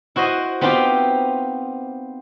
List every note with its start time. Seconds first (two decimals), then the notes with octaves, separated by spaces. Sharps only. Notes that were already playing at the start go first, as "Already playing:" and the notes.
0.16 E4 F#4 C5 D#5
0.61 B3 C4 D#4 F4 G4 G5